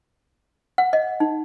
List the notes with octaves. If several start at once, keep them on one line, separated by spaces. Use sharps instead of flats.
F#5
D#5
D#4